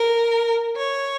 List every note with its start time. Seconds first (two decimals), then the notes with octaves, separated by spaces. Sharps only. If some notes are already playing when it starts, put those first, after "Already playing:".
Already playing: A#4
0.77 C#5